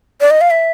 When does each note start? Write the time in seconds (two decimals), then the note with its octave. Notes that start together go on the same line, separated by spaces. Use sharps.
0.21 D5
0.31 D#5
0.41 F5
0.51 E5